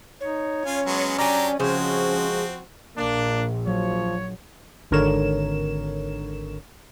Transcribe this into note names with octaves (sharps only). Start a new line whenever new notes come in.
D#4 C#5
C#4 F4 G#5
F#3 G#3 B3
F#3 D4 G4 D5 G#5 A#5
C#3 F3 G#3 C4 C#4 F#4 C5
A#1 A#3 D4
F3 F#3 C#5
G#1 D3 A#4 C#5 E7